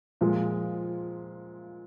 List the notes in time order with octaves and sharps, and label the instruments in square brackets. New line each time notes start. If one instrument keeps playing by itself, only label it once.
[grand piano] A#2 F3 G#3